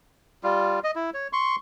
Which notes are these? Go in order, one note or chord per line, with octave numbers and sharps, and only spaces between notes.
G3 F4
D#5
E4
C#5
C6 C#6